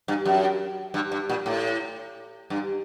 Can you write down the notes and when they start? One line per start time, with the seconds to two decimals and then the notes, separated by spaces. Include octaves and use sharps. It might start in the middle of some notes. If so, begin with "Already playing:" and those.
0.08 G2
0.25 F#2
0.94 G2
1.12 G2
1.29 A#2
1.46 A2
2.50 G2